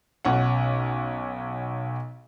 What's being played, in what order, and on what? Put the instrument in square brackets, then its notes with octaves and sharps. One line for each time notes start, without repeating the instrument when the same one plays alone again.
[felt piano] B1 C#4 F#5